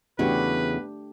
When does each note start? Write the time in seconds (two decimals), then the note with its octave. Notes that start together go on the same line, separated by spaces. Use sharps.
0.19 E2 C#3 A3 D4 F#4 G4 B4